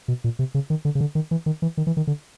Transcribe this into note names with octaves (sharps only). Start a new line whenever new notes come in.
B2
A#2
C3
C#3
D#3
D3
C#3
D3
D#3
E3
D#3
E3
D#3
E3
D#3
D3